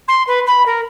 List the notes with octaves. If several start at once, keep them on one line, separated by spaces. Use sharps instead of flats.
C6
B4
B5
A#4